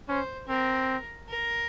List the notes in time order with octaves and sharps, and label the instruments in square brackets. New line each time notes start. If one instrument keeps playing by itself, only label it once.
[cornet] C#4 [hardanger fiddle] C5
[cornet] C4 [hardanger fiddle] A#4
[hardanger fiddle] A#4